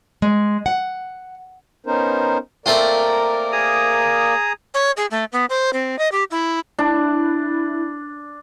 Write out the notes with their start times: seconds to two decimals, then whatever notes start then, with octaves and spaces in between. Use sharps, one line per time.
0.22 G#3
0.66 F#5
1.86 B3 C#4 D#4 A#4 C5
2.66 A3 A#3 C4 F4 A#4 D5
3.52 G#4 A#5 D#6
4.74 C#5
4.97 G#4
5.11 A3
5.32 B3
5.50 C5
5.73 C4
5.99 D#5
6.12 G4
6.31 E4
6.79 D4 E4